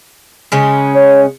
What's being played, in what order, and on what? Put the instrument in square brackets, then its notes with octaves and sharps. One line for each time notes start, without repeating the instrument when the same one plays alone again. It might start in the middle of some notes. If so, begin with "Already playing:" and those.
[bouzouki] C#3 G#3 C#4
[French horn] C#5